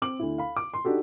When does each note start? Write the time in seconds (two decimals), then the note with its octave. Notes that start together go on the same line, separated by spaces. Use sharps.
0.02 C4 D6 F#7
0.19 D2 E4
0.38 F5 B5
0.57 D6
0.74 C6
0.85 D4 D#4 F#4 G4 A4